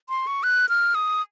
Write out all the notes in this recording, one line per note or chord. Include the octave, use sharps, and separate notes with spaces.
C6
C#6
F#6
F6
D#6